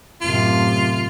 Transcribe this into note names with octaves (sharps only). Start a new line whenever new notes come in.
F#2 A2 C3 F4